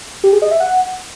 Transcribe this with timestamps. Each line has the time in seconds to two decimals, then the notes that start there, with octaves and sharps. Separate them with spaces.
0.24 G4
0.33 G#4
0.42 D#5
0.51 E5
0.60 F#5